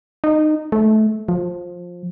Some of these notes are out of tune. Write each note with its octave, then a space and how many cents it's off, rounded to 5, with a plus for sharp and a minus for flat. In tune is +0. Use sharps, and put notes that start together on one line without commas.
D#4 -20
A3 -20
F3 +15